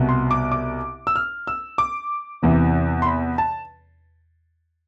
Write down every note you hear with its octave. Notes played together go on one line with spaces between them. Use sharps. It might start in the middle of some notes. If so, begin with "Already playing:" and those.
Already playing: C2 B2
C6
D6
D6
E6
F6
E6
D6
E2 C3 E3
C6
B5
A5